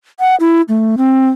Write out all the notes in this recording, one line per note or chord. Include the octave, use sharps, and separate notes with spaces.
F#5
E4
A3
C4